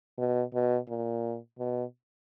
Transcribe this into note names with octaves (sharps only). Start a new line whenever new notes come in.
B2
B2
A#2
B2